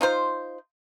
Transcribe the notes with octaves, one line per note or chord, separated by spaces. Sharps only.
D#4 F4 C5